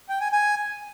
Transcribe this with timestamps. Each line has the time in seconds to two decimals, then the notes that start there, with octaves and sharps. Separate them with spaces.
0.09 G5
0.21 G#5
0.32 G#5